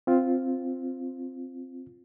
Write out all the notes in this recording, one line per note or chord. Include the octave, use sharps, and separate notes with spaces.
C4 F4